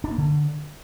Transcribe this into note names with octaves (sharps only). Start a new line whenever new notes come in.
D4
A#3
D3